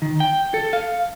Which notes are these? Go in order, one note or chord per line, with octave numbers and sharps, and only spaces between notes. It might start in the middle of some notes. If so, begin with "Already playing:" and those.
D#3
G5
A4
F5